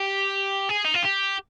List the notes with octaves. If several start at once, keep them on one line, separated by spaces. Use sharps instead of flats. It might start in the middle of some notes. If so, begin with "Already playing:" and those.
Already playing: G4
G#4
D#4
F4
G4